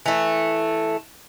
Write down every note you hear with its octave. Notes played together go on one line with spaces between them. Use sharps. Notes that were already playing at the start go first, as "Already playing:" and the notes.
E3 A3